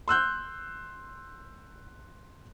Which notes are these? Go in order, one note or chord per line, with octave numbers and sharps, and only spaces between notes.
C6 E6 F#6 G6